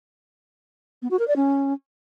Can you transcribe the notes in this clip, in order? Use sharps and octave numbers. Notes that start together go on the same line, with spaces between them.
B3
F#4
A#4
D5
C#4